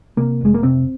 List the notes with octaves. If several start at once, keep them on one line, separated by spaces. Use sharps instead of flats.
C3 A#3
F1 G#3
A#3
C3 C4